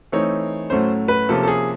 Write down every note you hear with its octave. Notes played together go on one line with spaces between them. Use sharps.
E3 A3 C4 D#4 C#5
A2 F#3 A3 C#4 C5
B4
C3 F3 A#3 C#4 A4
A4
G#4